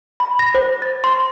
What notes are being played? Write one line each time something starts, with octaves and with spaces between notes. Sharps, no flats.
B5
A#6
C5
A6
C6